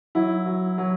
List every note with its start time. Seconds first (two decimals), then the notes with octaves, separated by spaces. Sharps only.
0.15 F#3 E4
0.46 F#3
0.78 F#3